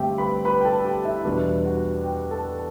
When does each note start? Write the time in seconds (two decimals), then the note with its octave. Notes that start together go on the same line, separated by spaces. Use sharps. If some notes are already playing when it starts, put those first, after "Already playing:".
Already playing: G2 D3 A3 C4 G4 G5
0.18 B4 B5
0.45 B4 B5
0.61 G5
0.65 A4 A5
0.85 G4 G5
1.05 E4 E5
1.25 E2 B2 G3 B3 D4 D5
1.64 F#4 F#5
2.04 G4 G5
2.31 A4 A5